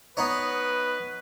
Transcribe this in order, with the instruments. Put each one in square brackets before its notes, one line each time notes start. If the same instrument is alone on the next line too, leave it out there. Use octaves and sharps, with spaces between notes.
[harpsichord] B3 D#4 C#5 [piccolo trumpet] B4